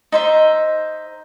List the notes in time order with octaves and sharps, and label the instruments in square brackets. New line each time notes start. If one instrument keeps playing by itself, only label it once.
[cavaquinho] D#4 C5 E5